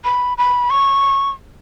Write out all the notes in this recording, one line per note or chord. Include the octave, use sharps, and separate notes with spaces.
B5
B5
C#6